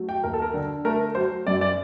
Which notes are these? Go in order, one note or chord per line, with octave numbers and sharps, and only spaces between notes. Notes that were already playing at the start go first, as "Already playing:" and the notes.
Already playing: F#3 A3
G5
D#2 A#4
A4
A#4
D3
A3 A#4
A#4
F#3 C5
F#2 D5
D5